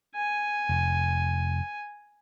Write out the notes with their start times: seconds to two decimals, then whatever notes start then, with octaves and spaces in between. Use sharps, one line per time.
0.15 G#5
0.69 F1